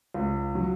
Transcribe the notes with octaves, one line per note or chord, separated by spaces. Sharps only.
C#2
F#3